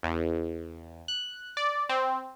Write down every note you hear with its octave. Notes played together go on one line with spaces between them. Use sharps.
E2
F#6
D5
C4